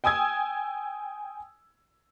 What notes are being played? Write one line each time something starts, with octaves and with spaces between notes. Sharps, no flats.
G5 G#5 D#6 E6 G#6